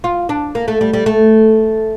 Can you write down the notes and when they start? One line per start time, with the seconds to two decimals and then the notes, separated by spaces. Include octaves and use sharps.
0.04 F4
0.29 D4
0.55 A#3
0.68 A3
0.81 G3
0.93 G3
1.06 A3